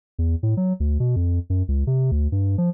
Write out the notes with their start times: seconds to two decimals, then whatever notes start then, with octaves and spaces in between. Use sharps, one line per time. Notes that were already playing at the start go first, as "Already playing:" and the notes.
0.19 E2
0.43 A2
0.57 F#3
0.80 D2
1.00 B2
1.16 F2
1.50 F#2
1.68 C#2
1.87 C3
2.11 D2
2.32 G2
2.58 F3